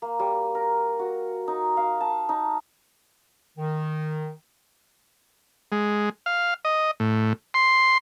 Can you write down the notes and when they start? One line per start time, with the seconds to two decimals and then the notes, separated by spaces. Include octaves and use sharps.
0.02 A#3
0.19 G3
0.55 A#4
0.99 F#4
1.48 D#4
1.77 F5
2.01 A5
2.29 D#4
3.57 D#3
5.72 G#3
6.26 F5
6.65 D#5
7.00 A2
7.54 C6